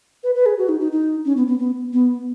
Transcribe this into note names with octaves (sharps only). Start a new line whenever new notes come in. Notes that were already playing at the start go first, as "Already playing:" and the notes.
B4
B4
G#4
F#4
D#4
D#4
D#4
C#4
B3
B3
B3
B3